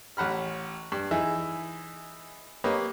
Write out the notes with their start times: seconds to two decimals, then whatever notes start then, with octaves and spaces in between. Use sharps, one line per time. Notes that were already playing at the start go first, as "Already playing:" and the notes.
0.17 A1 F#5 B5 F6
0.92 G2
1.11 E3 D#4 G#4 E5
2.64 A#3 G4 B4 C#5 D#5